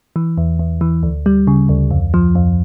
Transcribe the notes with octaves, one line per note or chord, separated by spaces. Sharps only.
E3
E2
E2
E3
D2
G3
C#3
D2
F2
F3
F2